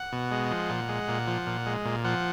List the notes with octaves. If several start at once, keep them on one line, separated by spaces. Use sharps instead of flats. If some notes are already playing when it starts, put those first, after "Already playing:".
Already playing: F#5
B2
G#3
F3
A#2
G#3
A#2
F3
A#2
G#3
A#2
F3 F#5